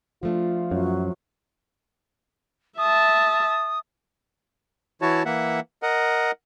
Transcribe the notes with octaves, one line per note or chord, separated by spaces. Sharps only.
F3 A3 D4 F4
F#2 F#3
E5 A5 D#6
E3 E4 F#4 C#5 A5
E3 A#3 E5 F#5
A#4 D#5 F#5